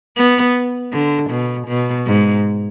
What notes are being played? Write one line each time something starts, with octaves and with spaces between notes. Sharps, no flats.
B3
D3
B2
B2
G#2